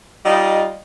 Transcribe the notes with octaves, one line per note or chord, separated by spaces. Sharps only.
G3 D#4 F4 D#5